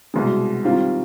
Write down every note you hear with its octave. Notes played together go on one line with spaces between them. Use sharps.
C2 B2 G#3
D#3 G3 C4 F4